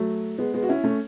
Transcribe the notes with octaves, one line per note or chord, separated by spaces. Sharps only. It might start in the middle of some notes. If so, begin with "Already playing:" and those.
Already playing: F#3 A3
G#3 B3
G#3 B3
F#4
C#4 E4
A3 C#4